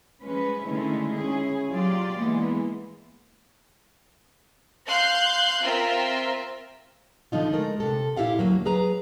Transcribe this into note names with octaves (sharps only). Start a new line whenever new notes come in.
F3 G#3 C#4 B4
D3 D#3 G#3 A3 C#4 E4
C#4 E4 G#4
F#3 F4 G4 D5
E3 G#3 A#3 B3
F5 C6 F#6 G6 C7
C4 F4 A#4 E5
D3 F3 D#4 F4
G#3 A3 A#4
C3 A4
A#2 E4 G4 G#4 F5 F#5
D2 G2 F#3 A#3
F#3 G#4 B4 A#5